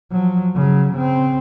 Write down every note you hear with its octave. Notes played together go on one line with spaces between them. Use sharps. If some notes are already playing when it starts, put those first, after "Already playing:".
F3 F#3
C#3 F#3
C#3 C4